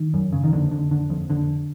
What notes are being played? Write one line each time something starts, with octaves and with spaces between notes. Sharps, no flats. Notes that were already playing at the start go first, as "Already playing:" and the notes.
Already playing: D#3
F#2
C#3
D#3
F2 D3
D3
D3
F2
D3